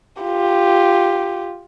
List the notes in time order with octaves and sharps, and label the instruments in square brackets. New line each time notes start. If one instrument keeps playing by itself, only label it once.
[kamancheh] F4 G4